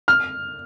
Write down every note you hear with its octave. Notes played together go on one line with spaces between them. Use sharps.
F6